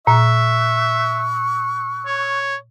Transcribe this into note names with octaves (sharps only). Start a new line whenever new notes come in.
A#2 E5 C#6 E6 F#6
C#5